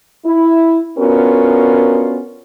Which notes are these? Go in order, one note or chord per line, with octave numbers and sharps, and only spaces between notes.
E4
B3 C#4 D4 F4 F#4 A#4